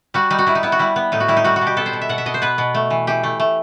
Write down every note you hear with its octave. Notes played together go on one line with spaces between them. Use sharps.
G3 F#4
G3 D#4
F#4
G3 E4
D#4
B3 E4
F#4
G3 E4
B3
A2 D#4
F#4
G3 E4
D#4
G3 F#4
F#4
B2
G4
B3 A4
C5
B2
E5
B2 F#5
E5
B2 D#5
C5
B3 B4
B2
A3
E3
E3 G4
A3
A3